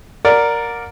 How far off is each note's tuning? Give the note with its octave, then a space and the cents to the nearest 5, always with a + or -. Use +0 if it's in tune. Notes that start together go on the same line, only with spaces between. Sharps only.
A#4 +0 D5 +0 F#5 -35